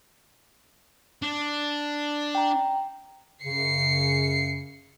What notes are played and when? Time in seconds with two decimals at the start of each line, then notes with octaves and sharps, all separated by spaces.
1.22 D4
2.35 G5 A#5
3.43 F#2 C#3 C7 C#7